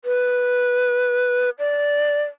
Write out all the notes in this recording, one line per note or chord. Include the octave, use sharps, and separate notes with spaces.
B4
D5